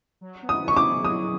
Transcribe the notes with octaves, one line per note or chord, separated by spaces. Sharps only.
F#3
B3
D#6
E4 C#6
D6
G#4
F#3 D#6